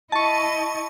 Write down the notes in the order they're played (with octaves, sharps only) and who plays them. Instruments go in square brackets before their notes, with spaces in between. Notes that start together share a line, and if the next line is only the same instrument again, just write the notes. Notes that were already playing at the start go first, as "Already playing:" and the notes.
[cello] E4 D#5 [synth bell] A5 C#6